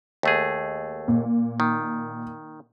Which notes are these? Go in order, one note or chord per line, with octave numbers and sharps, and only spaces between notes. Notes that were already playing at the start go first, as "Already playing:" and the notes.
D#2 A3 G#4
A#2
D#3